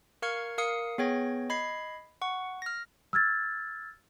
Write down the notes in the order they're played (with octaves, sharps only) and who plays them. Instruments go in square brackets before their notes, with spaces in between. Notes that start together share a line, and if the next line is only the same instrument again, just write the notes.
[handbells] A#4 F5 C#6 F6 G#6 C#7
A#4 F5 D#6 C#7
B3 G#4 C#5 G5 G#6 A#6
D#5 B5 G#6 C7
F#5 C#6
F6 A#6
[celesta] E6 F6 G#6 A6